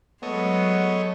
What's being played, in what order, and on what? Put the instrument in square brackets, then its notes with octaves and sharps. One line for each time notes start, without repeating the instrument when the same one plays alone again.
[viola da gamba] F#3 G#3 [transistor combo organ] A3 C#5 D#5 [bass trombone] B3